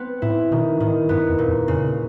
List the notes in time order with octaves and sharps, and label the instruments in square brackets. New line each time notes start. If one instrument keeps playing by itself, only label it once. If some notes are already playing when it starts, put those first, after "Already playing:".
Already playing: [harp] B3 C4
[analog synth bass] A2 [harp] E4
[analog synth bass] B2 [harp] D#3
[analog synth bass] A2 [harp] D#3
[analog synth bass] G2 [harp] B3
[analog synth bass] F2
[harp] A#2
[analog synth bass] F2
[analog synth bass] F2 [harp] C#3